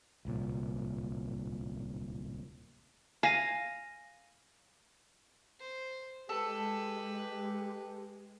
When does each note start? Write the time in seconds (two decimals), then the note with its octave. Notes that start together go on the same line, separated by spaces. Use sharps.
0.25 D1 C2 A#2
3.23 F5 G#5 A#6 D#7
5.59 C5
6.29 G#3 G4 A4 B4